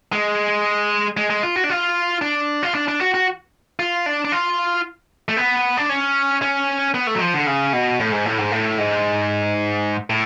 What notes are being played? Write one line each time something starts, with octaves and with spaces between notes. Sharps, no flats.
G#3
G#3
G#3
F4
F#4
D4
F4
D4
F4
D4
D4
F#4
F#4
F4
D4
D4
F4
A3
B3
D4
C#4
C#4
B3
A3
F#3
F3
D3
C#3
B2
A2
G#2
A2
G#2
A2
G#2
A2